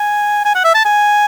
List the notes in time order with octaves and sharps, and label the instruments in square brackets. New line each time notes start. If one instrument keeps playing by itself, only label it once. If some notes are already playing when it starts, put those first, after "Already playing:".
Already playing: [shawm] G#5
G#5
F#5
E5
A5
G#5